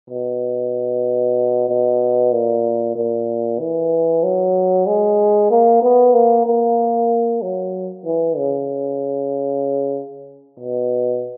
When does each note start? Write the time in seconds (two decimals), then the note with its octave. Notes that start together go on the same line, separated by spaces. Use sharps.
0.10 B2
1.69 B2
2.33 A#2
2.96 A#2
3.60 E3
4.23 F#3
4.86 G#3
5.51 A#3
5.82 B3
6.14 A#3
6.47 A#3
7.42 F#3
8.06 E3
8.37 C#3
10.59 B2